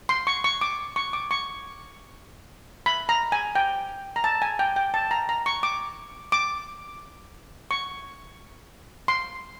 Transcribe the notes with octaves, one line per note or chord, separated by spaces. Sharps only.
C6
C#6
C#6
D6
C#6
D6
C#6
B5
A#5
G#5
G5
A#5
A5
G#5
G5
G5
A5
A#5
A#5
C#6
D6
D6
C#6
C6